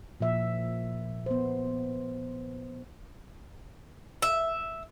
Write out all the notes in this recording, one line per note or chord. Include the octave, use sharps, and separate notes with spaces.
A#2 F3 E5
B3 C5
E5